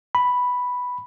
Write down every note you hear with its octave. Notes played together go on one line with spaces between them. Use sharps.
B5